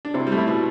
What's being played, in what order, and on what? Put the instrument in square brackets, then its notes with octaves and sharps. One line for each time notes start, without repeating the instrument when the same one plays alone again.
[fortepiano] D4
[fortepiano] C3 C4 [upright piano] E4
[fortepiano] G3
A3
[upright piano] E4
[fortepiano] B2 B3